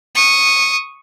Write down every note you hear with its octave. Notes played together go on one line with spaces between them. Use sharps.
C#6 D#6